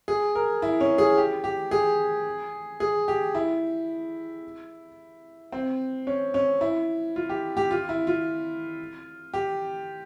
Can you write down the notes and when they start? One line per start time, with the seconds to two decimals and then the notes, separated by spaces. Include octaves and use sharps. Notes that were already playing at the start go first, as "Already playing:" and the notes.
0.08 G#4
0.35 A#4
0.62 E4
0.81 C#4
0.98 G#4
1.17 G4
1.44 G4
1.71 G#4
2.80 G#4
3.08 G4
3.35 E4
5.52 C4
6.07 C#4
6.34 C#4
6.61 E4
7.16 F4
7.29 G4
7.57 G4
7.71 F4
7.89 E4
8.07 F4
9.34 G4